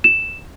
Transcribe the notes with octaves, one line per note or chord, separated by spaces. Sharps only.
E7